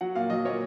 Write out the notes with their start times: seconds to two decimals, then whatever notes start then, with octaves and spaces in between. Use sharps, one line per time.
0.01 F#3 F#5
0.15 A#2 F5
0.30 F#3 D#5
0.45 A#2 C#5